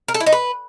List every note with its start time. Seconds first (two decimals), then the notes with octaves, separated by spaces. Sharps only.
0.08 A#4
0.14 A4
0.20 E4
0.26 D#4
0.32 B4